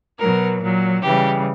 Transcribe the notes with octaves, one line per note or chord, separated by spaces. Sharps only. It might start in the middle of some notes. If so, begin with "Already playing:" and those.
B2 F#3 A#4
A#2 F#3
C#3 E3 G3 G4